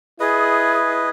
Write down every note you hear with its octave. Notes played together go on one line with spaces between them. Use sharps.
E4 G#4 B4 D#5